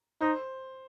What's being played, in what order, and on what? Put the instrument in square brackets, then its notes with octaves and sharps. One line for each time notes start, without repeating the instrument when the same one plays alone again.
[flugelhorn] D#4 [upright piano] C5